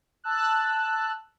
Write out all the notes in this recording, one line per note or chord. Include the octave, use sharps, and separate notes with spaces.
A5 E6 F#6